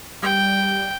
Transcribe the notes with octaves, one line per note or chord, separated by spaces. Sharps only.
G3 G5